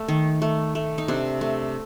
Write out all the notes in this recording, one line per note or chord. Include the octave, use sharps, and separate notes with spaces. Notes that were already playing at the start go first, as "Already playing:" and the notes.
Already playing: A3
D#3
A3
A3
D#4
C3 D4
A3